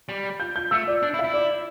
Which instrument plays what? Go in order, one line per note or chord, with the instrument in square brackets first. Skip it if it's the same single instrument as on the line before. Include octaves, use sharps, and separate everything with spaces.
[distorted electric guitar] G3
[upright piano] G6
G6
[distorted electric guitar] A3 [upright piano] E6
[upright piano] D5
[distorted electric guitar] D4
E4
[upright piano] E5
[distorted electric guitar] E4
[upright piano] D5